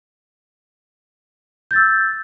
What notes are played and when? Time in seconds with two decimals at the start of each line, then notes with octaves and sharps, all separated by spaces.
1.71 G6
1.73 A6
1.76 E6